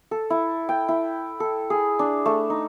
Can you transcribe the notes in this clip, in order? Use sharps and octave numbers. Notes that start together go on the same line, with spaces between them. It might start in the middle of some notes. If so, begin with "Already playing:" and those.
A4
E4
G5
E4
A4
G#4
D4
A3
D#4